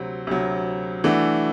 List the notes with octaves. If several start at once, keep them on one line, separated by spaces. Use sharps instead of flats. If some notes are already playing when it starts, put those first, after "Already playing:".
Already playing: D2 C3 F#3
D2 C3 F#3
E3 A3 D4 F#4